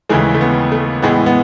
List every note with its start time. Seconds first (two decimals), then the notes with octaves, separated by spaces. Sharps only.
0.09 D#2 C#3 E3 G#3 A3
0.35 A3
0.41 B3
0.72 A3
1.02 A2 E3 G#3 B3
1.26 B3